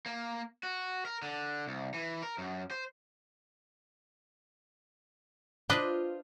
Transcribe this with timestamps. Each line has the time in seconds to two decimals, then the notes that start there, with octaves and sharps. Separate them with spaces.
0.06 A#3
0.63 F#4
1.05 A#4
1.22 D3
1.68 C2
1.94 E3
2.23 A#4
2.38 F#2
2.71 C5
5.70 D4 F4 B4 C5 D5 D#5